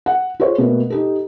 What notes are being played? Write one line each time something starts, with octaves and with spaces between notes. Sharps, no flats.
F#5
F4 G#4 C5 C#5
B2 A3 A#3
D#4 G4 A4